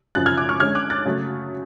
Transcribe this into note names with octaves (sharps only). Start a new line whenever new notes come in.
F#2 C#3 F3 F#6 A6
F6 G#6
D6 F#6
C#6 F6
D3 G#3 C#4 F6 G#6
D6 F#6
F#6 A6
C#3 F#3 A3